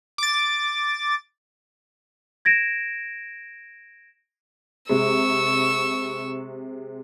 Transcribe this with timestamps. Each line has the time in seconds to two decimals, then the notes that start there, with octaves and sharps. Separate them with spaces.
0.18 D6 A6
2.45 G#6 A#6 D7 E7
4.89 C3 G#3 C#6 E6